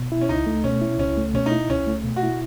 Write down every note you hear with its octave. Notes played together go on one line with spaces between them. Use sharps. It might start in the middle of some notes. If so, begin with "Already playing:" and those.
Already playing: B2
E4
C#4
C#2 D#4
A3
B2 C#4
E4
C#2 C#4
A3
B2 C#4
D#4
E4
C#2 C#4
A3
B2
F#4
E4